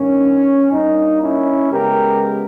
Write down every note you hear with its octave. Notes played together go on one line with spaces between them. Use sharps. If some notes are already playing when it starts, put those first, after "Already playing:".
Already playing: G2 D#3 A#3 C#4
G2 G3 A#3 D#4
C#4 E4
C#3 G#3 B3 G4 A#4